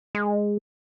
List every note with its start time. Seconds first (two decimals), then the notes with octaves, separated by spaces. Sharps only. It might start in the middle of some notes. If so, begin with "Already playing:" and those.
0.15 G#3